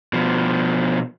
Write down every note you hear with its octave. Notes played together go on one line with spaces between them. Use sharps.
B2 F3